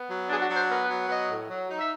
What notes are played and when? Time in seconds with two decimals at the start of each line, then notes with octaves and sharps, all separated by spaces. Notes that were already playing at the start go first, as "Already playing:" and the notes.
Already playing: B3
0.09 F#3
0.29 D4 G#4
0.42 F#4
0.49 F#3
0.56 C5
0.69 B3 A#4
0.83 B4
0.89 F#3
1.09 B3 D#5
1.30 A2
1.49 F#3
1.69 D#4
1.79 E5